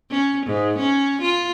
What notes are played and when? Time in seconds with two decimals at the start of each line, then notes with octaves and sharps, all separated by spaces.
0.11 C#4
0.46 G#2
0.78 C#4
1.22 F4